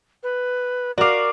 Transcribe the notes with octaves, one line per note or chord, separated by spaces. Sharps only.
B4
F#4 A#4 D5 F5 D6